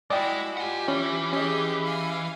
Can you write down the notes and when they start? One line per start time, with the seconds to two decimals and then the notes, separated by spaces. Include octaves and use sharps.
0.10 G#3 E4 F#4 D5 D#5 G5
0.57 F4 G4 F#5 G#5
0.88 E3 C#4
1.33 C#4 G4 G#4 D#5
1.84 F5 G#5